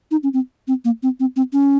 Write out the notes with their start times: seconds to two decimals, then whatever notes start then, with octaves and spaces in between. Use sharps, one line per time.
0.11 D#4
0.23 C#4
0.34 C4
0.68 C4
0.85 A#3
1.03 C4
1.20 C4
1.36 C4
1.53 C#4